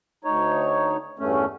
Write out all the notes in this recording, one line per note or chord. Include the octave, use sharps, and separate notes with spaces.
D2 D#4 C#5
E2 G2 A3 C#4